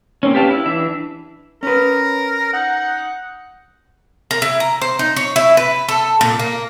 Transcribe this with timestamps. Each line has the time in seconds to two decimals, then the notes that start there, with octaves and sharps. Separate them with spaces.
0.23 A#3 C4 C#4
0.34 G4 B4 D5 F5 A5
0.51 E4
0.66 E3 D4 E5
1.63 C#4 A#4 B4
2.53 D#4 F#5
4.31 A#4
4.42 E4
4.60 A#5
4.82 C5
4.99 D#4
5.16 C#5
5.36 E4
5.57 B4
5.89 A4
6.21 A#2
6.39 A#3